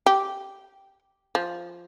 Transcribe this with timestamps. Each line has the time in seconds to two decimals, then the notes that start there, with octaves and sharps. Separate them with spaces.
0.06 G4
1.35 F3